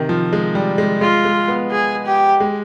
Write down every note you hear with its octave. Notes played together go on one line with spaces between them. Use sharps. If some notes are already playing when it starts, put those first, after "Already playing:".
Already playing: C3 D#3
F3
G#3
G3
G#3
G#3 F4
G#3
B3
G#4
G4
G#3